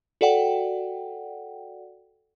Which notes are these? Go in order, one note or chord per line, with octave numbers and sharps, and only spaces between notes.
F#4 A4 D5 F#5 G5